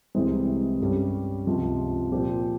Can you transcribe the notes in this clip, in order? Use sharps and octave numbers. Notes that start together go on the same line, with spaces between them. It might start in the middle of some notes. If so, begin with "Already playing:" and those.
C2 C3 E3 G#3 C4
G2 G3 C#4
C#2 C3 F3
A#2 F3 C4 G4